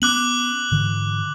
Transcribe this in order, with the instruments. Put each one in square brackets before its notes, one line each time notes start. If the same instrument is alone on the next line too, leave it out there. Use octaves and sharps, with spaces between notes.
[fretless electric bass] B3 C#4 [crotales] D6 F#6 F#7
[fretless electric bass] G#2 D3 E3